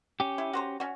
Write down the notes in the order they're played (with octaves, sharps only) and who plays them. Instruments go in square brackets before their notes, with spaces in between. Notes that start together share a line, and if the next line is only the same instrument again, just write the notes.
[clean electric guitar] C#4 G4
[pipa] E4
F#4 C5 A#5
C#4 F#4